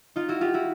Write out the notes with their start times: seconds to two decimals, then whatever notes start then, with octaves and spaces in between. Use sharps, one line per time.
0.16 D#4 F4
0.28 E4 F#4
0.41 F4 G4
0.54 E4 F#4